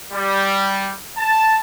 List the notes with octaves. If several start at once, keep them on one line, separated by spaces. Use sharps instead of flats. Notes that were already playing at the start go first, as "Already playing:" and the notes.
G3
A5